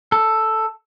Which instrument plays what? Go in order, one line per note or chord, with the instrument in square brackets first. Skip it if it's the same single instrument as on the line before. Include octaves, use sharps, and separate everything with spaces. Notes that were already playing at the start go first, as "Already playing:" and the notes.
[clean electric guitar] A4